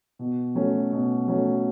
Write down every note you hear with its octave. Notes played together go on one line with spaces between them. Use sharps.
B2
F#3 A3 C#4
B2
F#3 A3 C#4